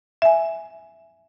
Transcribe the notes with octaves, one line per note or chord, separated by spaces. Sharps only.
E5 G#5